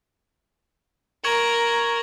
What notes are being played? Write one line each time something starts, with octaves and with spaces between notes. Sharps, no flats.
A#4 C#6 G#6 F#7